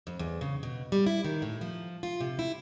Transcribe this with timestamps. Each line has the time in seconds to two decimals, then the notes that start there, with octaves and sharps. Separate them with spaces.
0.07 F2
0.19 E2
0.41 C#3
0.63 B2
0.92 G3
1.06 E4
1.24 D#3
1.42 A2
1.61 F3
2.03 F4
2.21 C3
2.39 E4